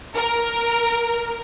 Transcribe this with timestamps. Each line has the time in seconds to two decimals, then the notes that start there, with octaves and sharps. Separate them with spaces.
0.15 A#4